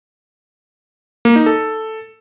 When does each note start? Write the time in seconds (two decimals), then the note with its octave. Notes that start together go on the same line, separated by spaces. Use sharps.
1.25 A#3
1.36 D#4
1.46 A4